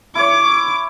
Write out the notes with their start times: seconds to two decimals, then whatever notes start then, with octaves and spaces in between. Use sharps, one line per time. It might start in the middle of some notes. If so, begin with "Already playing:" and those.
0.15 E4 C#5 D6